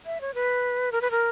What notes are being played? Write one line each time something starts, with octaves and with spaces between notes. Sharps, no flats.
E5
C#5
B4
A#4
B4
A#4